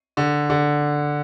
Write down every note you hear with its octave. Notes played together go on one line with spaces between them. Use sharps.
D3
D3